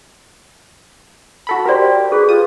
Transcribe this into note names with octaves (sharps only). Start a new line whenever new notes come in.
F#4 A4 B5
F#4 G4 A#4 C5 D5
G#4 A4 B4
F4 D#6